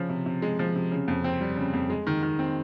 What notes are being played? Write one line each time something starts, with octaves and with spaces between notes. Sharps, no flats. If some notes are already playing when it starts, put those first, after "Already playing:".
Already playing: C#3 F3
C3
C3
G#3
F3
C3
C#3
F2
C4
G3
C#3
F2
G#3
D#3
D#3
C4